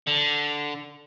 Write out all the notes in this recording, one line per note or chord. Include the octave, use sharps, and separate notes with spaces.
D3